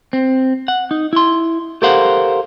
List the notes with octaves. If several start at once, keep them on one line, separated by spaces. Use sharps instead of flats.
C4
F#5
D#4
E4 C6
G4 A4 A#4 C5 F5 F#5